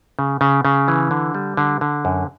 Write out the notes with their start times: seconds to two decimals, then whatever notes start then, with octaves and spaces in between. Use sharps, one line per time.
0.19 C#3
0.41 C#3
0.65 C#3
0.88 E3
1.11 D3
1.35 G3
1.57 D3
1.81 D3
2.05 F#2